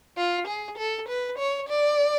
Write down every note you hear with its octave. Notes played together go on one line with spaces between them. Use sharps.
F4
G#4
A4
B4
C#5
D5